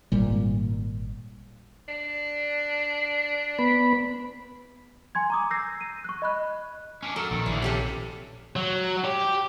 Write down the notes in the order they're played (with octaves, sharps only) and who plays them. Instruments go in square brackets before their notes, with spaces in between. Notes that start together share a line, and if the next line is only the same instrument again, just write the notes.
[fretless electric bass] G#1 A#2 G3
[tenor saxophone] D4
[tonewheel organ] B3 B5
[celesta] G#5 C6 G#6
A#5 D6 D#6
E6 G6 A#6 C7
D#7
C#6 F#6
D#5 B5 F#6
[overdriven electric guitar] C#4 D4
[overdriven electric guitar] F#3 A#4 [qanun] A4
[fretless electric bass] A#1 [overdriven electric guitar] D3 D#3
[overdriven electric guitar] D3 E3 [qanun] D5
[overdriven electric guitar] C3 [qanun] C#4 G4 A4
[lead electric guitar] F#3
G4